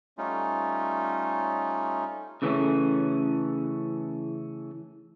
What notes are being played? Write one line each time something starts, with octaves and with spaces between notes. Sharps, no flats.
G3 A3 C#4 D#4 F4
C#3 E3 A3 C#4